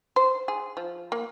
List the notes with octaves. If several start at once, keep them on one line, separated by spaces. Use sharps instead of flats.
C5
G#4
F3
A#3